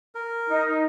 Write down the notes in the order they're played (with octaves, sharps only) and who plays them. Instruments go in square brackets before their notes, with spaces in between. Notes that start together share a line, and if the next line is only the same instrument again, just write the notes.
[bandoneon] A#4
[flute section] D#4